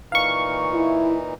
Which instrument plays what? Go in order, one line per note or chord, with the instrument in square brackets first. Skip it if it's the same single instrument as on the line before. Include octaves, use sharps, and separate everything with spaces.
[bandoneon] A#2 E3 D#4 [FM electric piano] F5 C#6
[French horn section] E4